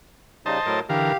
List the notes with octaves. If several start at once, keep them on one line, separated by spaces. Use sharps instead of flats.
C#3 G3 D#4 C5 D#5 A5
A2 F#3 A#4
D3 E3 G4 A#4 F5